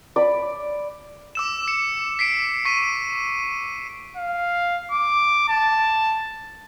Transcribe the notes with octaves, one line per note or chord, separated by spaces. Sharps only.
D5 B5
D6 E6 E7
C#7
B6 C7 D7
C#6 B6 D#7
F5
D6
A5